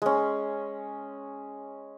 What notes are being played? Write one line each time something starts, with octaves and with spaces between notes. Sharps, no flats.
G#3 C#4